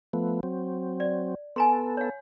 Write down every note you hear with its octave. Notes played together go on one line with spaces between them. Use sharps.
F3 A3 B3
F#3 C4
D5
B3 A4 G#5 A#5 C6
C#5 F5